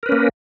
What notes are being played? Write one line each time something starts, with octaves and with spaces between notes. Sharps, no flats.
A#3 C#4 A#4 B4